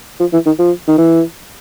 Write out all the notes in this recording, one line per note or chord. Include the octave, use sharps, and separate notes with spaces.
F3
E3
D#3
F3
D#3
E3